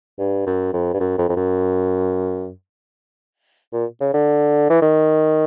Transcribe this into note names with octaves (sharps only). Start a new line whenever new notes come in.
G2
F#2
F2
G2
F#2
F2
F2
F#2
A#2
C#3
D3
E3
D#3